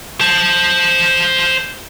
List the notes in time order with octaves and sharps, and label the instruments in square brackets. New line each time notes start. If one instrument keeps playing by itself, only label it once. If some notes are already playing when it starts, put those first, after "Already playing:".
[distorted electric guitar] C5 A5